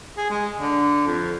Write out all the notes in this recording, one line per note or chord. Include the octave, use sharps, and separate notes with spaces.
G#4
G#3
D3
F2